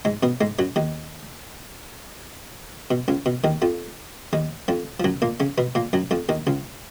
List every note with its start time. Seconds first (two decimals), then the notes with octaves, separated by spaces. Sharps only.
0.05 G#2 G#3
0.23 B2 B3
0.41 G#2 G#3
0.59 F#2 F#3
0.76 D#2 D#3
2.91 B2
3.08 C#2 C#3
3.26 B2
3.44 D#2 D#3
3.62 F2 F3
4.33 D#2 D#3
4.68 F2 F3
5.00 F3
5.04 F#2 F#3
5.22 A#2 A#3
5.40 C#3 C#4
5.58 B2 B3
5.75 A#2 A#3
5.93 F#2 F#3
6.11 F2 F3
6.29 D#2 D#3
6.47 C#2 C#3